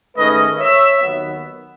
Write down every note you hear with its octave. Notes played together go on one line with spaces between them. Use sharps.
G#2 D#3 A3 C#4 B4 D#5
C#5 E5
D#2 D#3 F#3 B3